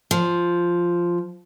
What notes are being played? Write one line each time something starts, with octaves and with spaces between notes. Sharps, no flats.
F3